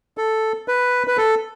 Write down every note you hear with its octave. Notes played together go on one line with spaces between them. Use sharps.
A4
B4
B4
A4